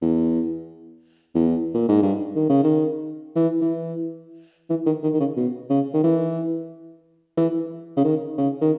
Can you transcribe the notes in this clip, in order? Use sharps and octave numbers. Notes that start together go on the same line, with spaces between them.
E2
E2
A#2
G#2
G2
D#3
C#3
D#3
E3
E3
E3
D#3
D#3
D#3
C#3
B2
C#3
D#3
E3
E3
C#3
D#3
C#3
D#3